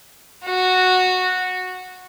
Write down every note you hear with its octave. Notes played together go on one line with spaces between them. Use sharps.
F#4